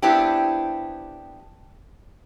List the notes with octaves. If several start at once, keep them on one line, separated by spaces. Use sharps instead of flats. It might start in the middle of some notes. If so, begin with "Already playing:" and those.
B3 C4 D4 E4 G4